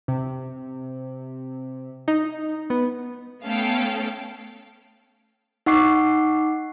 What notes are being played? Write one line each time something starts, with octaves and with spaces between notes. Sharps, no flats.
C3
D#4
B3
A3 B3 C#4 A4 F5 G5
D#4 F#5 C#6 D6 C7